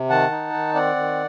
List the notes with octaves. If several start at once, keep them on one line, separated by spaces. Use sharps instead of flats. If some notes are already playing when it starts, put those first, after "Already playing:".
Already playing: C3
D#3 F#5 A5
D#4
D#3
C4 D5 F#5
D#3